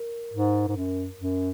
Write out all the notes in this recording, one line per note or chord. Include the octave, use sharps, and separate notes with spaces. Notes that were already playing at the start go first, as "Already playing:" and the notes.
Already playing: A#4
G#2
G#2
F#2
F#2